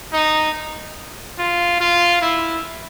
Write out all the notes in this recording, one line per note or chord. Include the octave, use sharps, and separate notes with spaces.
D#4
F4
F4
E4